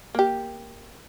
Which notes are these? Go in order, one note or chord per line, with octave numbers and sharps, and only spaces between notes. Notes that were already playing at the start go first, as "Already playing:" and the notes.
A#3 G4